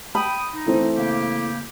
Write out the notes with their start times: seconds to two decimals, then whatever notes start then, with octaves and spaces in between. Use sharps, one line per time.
0.15 G5 B5 D#6
0.54 D#4
0.66 E3 A3 C4
0.96 C#3 A#3 G4